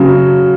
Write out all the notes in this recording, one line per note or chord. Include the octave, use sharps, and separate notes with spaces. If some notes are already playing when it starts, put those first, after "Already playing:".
Already playing: C#3 F#3